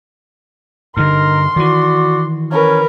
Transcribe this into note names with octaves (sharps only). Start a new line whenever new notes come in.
G2 D3 D#4 A#4 C6
D#3 E3 F#4 D5
C#4 A#4 B4